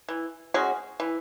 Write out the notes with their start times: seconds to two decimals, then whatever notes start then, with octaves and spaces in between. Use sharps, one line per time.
0.08 E3
0.54 G#3 C#4 F#4
1.00 E3